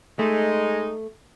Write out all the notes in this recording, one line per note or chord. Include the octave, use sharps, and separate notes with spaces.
G#3 A3 D#4